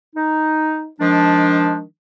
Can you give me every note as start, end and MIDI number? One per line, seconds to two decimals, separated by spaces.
0.15 0.87 63
0.99 1.82 51
0.99 1.82 53
0.99 1.82 56
0.99 1.82 62